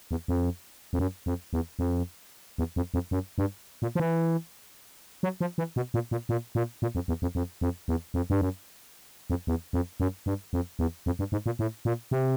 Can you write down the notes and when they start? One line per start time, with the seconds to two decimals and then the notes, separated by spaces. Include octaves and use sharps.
0.11 E2
0.28 F2
0.93 F2
0.99 F#2
1.26 F2
1.53 E2
1.79 F2
2.58 E2
2.76 F2
2.94 F2
3.11 F#2
3.38 G2
3.82 A#2
3.95 F3
4.00 E3
5.23 F#3
5.41 F3
5.58 E3
5.76 B2
5.94 A#2
6.11 A#2
6.29 A#2
6.55 A#2
6.82 A#2
6.95 F2
7.08 E2
7.22 F2
7.35 F2
7.61 F2
7.88 E2
8.14 F2
8.30 G2
8.41 F#2
9.30 F2
9.47 E2
9.73 F2
10.00 F#2
10.26 G2
10.53 F2
10.79 E2
11.06 F2
11.19 G2
11.32 G#2
11.46 A#2
11.59 A2
11.85 A#2
12.11 C3